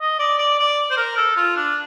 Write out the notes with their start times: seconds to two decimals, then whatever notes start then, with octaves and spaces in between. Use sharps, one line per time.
0.01 D#5
0.19 D5
0.39 D5
0.59 D5
0.91 C5
0.97 A#4
1.17 A4
1.36 F4
1.56 D4